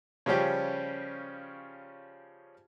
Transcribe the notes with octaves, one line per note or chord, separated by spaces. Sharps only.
C#3 F3 G3 C#4 G4